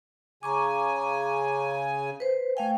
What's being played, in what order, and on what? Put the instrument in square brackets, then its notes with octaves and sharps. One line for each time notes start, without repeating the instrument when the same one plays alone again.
[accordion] C#3 G#5 [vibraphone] A#5 C#6 D6
[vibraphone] B4 C5
[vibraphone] A3 F5 G5 [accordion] G#5